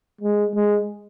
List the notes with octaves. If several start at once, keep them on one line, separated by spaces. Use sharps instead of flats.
G#3
G#3